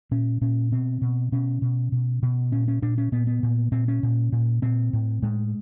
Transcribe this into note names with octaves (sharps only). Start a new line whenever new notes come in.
A#2 C#4
A#2 C#4
B2 C4
B2
B2 C#4
B2
B2
B2
A#2 C#4
C#4
A#2 D4
C#4
A#2 B3
B3
A#2
A#2 C4
C#4
A#2
A#2
A#2 C4
A2
A2 G#3